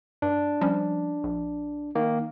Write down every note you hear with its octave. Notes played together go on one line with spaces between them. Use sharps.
G2 D4
F3 G3 C#4
A#1
D#3 A#3